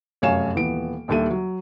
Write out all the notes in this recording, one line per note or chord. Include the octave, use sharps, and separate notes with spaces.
F1 F#2 C#5 F5 G#5 E7
D#1 E3 B3 D7
A#1 D#2 G3 A4 E5 D#7
F#3